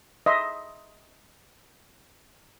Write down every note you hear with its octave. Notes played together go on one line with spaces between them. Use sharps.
D#5 E5 C6